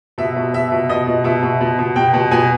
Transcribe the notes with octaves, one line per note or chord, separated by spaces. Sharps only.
B2 E5
B2
B2 E5
B2
B2 D#5
B2
B2 E5
B2
B2
B2
B2 G5
B2
B2 G#5